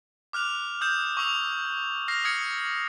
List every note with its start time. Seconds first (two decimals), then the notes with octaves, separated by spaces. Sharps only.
0.33 D6 F6 F#6 F7
0.81 D#6 G6 E7
1.17 C#6 D6 E6 F7
2.08 F6 A#6 C7 F7
2.24 D#6 F6 G#6 C#7